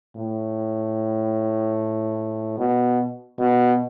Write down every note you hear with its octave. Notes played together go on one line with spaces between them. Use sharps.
A2
B2
B2